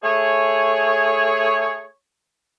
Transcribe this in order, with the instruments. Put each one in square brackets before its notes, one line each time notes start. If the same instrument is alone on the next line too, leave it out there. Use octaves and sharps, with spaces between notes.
[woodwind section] A3 G#4 C#5